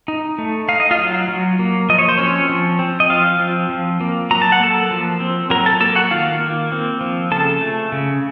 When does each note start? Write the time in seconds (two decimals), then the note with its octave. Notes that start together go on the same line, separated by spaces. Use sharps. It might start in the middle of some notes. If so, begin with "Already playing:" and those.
0.08 D#4
0.38 A3
0.69 D#4 F5
0.80 D#5
0.91 F4 F5
0.99 F#3
1.28 F#3
1.59 A#3
1.89 F3 D#5
1.99 C#5
2.09 C5
2.18 C4 C#4 C#5
2.49 F3
2.79 C4
3.00 D#5
3.10 F3 F4 F5
3.40 C4
3.69 F3
4.01 A#3
4.31 F#3 A#5
4.42 A5
4.52 F#5
4.60 A#3 A4 A5
4.91 F3
5.20 C4
5.50 F#3 A#4 A#5
5.66 A4 A5
5.80 A#3 A4 A5
5.95 F#4 F#5
6.11 D#3 F4 F5
6.41 A#3
6.72 C4
7.01 F3
7.32 C#3 A4 A5
7.61 A3
7.92 C#3